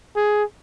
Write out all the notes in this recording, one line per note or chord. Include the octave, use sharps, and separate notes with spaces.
G#4